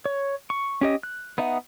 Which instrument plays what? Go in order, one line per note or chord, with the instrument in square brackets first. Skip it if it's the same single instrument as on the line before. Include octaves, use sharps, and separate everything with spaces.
[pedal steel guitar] C#5
C#6
C#4 G4 D#5
F#6
B3 D#4 E5 F#5